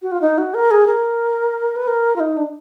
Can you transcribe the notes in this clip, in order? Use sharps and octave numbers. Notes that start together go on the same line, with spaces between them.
F#4
F4
D#4
F#4
A#4
G#4
A#4
B4
A#4
F4
D#4
D4